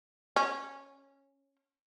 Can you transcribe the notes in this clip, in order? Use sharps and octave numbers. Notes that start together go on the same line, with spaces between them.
C#4